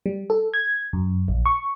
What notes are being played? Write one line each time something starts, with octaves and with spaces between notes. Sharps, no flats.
G3
A4
G#6
F#2
A#1
C#6